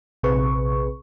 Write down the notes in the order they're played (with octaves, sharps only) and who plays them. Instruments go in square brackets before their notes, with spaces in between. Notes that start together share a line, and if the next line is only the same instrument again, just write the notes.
[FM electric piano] A#1 C3 C4 G#4 B4 C#6